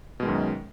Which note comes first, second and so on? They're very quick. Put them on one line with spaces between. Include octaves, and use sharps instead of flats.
B2 G#3 D#3 F#2